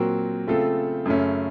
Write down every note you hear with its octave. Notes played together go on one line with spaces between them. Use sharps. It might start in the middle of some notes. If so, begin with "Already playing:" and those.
Already playing: A#2 F#3 C4 F#4 A#4
C#3 A3 C4 F4 A4
F#2 C#3 A3 C#4